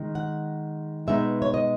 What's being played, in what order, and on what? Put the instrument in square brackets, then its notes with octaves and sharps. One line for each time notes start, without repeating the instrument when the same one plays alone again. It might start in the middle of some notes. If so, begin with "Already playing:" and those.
Already playing: [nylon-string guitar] D#3 G#3
F#5
B2 G#3 B3 D#4 E5
C#5
D#5